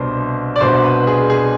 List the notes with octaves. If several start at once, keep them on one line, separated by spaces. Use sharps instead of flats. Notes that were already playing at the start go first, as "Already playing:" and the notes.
Already playing: C2 B2 B3 D4 C5
D5
C2 B2 B3 D4 C5
B4
G#4
G#4